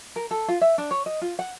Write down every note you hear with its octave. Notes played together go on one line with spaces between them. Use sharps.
A#4
A4
F4
E5
D4
C#5
D#5
F4
F#5